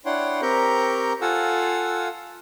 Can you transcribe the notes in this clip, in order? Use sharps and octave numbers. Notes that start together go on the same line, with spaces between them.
D4 E4 C#5 F#5 G5 C6
C4 G4 A#4 A#5 C#6 G6
F4 A4 F5 F#5 G#5 E6